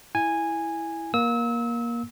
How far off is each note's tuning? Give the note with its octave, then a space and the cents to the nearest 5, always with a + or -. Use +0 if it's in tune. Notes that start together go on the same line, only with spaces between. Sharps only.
E4 +0 G#5 -10
A#3 +20 E6 -30